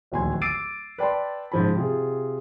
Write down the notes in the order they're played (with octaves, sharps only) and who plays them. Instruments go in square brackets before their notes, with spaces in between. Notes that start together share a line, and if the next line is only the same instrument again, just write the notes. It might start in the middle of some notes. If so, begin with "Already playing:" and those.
[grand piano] D1 A#1 D#2 G#5 C6 G#6
D6 E6 A6 C7 D7 D#7
B4 D5 G5 A5 C6
G#2 C#3 F3 A5 B5
C3 F4 G#4